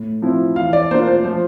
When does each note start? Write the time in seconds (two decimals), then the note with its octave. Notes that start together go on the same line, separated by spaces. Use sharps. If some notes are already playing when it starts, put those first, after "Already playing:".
Already playing: A2
0.22 F3 C4 E4
0.56 E3 F5
0.73 D5
0.91 A#3 D4 F4 C5
1.07 C5
1.24 F3 C5